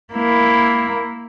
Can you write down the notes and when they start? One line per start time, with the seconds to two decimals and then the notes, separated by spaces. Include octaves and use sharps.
0.14 A#3 E4